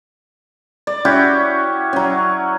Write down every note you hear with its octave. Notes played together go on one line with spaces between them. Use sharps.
D5
C#4 E4 F#4 G4
F#3 C#4